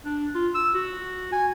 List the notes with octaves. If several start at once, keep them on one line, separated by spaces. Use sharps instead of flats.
D4
F4
E6
F#4
G#5